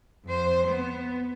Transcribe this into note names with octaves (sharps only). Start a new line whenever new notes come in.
F2 C5
B3